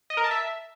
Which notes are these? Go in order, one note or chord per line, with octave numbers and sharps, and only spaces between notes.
D#5
A#4
A5
E5